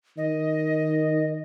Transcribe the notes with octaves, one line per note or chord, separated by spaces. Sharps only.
D#3 D#5